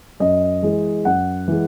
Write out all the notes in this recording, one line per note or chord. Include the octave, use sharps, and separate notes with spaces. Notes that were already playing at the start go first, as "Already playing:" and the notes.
F#2 D#5
E3 G#3
F#2 F#5
E3 G#3